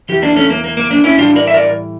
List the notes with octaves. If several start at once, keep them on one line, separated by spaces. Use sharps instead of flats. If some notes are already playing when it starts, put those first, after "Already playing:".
E2 E3 G4
A#3 D4
A3 C#4
A#3
A#3
A#3
A#3 D4
C#4 E4
A2 E3 G3 D4 F4
A#4 D5
E5
A#4 D5